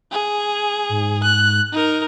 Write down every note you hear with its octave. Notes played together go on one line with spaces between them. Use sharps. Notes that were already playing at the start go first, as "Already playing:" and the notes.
G#4
G#2
F#6
D#4 A#4